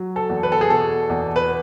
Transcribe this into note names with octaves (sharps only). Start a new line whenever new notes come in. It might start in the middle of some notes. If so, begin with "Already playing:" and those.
Already playing: F#3
A4
E2
B4
A4
G#4
B2 A4
E2
B4